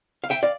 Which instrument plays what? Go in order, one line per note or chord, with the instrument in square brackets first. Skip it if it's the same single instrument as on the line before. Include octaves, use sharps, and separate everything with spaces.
[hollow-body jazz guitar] F5
E5 G5
D5 F5